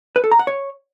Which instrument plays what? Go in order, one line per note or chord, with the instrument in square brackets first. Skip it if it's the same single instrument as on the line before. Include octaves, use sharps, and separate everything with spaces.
[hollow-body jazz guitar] B4
A4
A#5
F#5
C#5